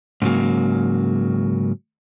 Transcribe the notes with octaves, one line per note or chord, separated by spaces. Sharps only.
G#2 C#3 F#3 A#3